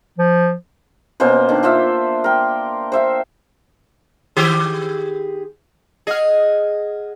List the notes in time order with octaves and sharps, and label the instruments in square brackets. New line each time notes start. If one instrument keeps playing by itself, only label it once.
[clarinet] F3
[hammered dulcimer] B2 A#3 C#4 C5
D#3 D4
D4 F4 C5 E5
A#4 G5
C5 E5 F5
[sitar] D#3 G4 G#4
[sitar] G#4 [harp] D#5 F#5 F6